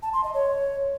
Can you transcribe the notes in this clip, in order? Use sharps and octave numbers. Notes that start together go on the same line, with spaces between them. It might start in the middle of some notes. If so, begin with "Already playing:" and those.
A5
C6
D#5
C#5